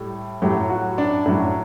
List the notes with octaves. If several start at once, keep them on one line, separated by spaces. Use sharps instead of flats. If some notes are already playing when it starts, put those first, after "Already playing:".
Already playing: A2 G3
A2 F#3 G4
F#4
D4
A2 F#3 D4